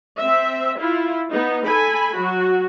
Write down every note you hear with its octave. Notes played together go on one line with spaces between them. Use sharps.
C4 E5
E4 F4
B3 D#4
A4 G#5 B5
F#3 F#4